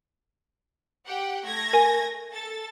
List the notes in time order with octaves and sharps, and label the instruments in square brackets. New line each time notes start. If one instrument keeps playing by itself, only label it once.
[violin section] G4 F#5 G5
A3 G#6 A#6
[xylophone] A#4 G#5
[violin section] A4 A6